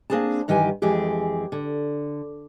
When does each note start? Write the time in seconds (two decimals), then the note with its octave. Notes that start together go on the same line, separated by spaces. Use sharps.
0.10 A#3 C4 D4 G#4 C5 A5
0.48 G2 D#3 E3 G4 G#5
0.82 F2 E3 G#3 G4 G#4
1.52 D3